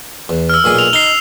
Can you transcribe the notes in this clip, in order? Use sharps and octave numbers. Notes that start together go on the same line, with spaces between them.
E2
E6 F6
B1 A#2 G#4
F7
D#4 C7 F7 G7